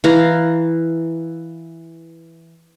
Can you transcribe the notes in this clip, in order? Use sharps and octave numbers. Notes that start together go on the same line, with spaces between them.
E3 F5 A#5